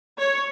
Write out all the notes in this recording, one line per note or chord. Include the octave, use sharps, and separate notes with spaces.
C#5